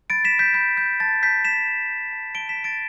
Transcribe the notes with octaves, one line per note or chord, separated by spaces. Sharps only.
B5 A6 D7
B6 E7
B5
G6 B6
B5 G6
G6
A5 A6
A5 G6 B6
G6 B6 E7
A5
G6
A5
A5 D7 G7
B6 E7
A5
A6 D7